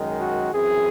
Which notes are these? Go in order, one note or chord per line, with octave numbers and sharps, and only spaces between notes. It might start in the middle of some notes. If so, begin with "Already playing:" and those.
Already playing: F#2 D#3 G#3
F#4
F#2 E3 C4 G#4